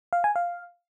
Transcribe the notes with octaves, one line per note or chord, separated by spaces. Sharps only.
F5
G#5
F5